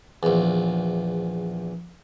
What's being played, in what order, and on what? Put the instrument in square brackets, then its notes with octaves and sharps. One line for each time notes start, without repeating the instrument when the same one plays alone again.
[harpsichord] A#1 E2